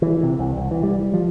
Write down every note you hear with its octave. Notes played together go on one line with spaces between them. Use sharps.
E3
C3
C2
C2
E3
G3
F3